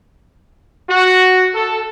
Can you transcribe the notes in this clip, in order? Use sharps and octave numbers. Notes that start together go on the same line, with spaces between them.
F#4
A4